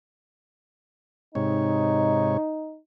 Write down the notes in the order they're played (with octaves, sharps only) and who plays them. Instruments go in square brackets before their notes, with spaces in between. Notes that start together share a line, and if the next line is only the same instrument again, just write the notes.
[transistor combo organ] G#2 C3 C#5 [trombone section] D#4